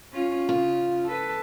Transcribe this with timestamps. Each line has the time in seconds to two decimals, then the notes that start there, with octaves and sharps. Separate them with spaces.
0.13 C#4 F4
0.49 C#3 F4
1.06 A4 B4